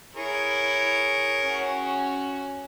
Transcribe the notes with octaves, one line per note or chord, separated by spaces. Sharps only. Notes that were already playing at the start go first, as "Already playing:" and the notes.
E4 G#4 A#4 C#5
C#4 F#4